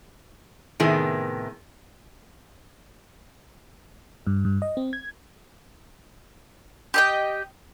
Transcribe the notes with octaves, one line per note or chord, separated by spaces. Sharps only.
A2 C3 D#3 B3 G#4
G2
G2
D#5
C4
G#6
G4 D#5 G5